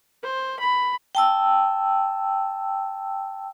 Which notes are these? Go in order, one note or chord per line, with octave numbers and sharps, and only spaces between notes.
C5
B5
G5 A5 E6